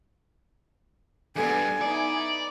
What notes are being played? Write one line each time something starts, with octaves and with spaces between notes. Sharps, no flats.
E2 G2 B3 D4 A4 F5 G#5
B3 D#4 E4 D5